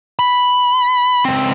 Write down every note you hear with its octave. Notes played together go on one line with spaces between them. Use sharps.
B5
C#2 C4